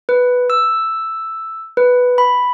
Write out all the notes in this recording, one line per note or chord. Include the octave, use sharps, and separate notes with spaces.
B4
E6
B4
B5